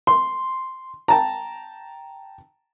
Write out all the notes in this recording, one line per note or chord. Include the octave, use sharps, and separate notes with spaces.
C6
G5 A5 A#5